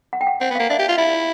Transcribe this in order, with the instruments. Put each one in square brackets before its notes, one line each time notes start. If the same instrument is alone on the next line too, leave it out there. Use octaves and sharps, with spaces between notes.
[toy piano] F#5
G5
F#5
[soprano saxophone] C4 [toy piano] F#5
[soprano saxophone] B3
[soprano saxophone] A#3 [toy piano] F5
[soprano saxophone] D4 [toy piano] E5
[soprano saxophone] G4
F4
[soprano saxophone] E4 [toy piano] E5